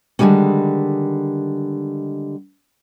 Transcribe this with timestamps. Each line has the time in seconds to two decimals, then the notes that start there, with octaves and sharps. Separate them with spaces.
0.19 D3 D#3 F3 G3 G#3 C#4